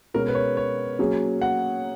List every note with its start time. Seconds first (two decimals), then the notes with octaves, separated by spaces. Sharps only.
0.14 B2 G#3 C#4 A#4
0.28 B4
0.35 C#5
0.57 C#5
0.99 F#3 A#3 C#4 G#4
1.41 F#5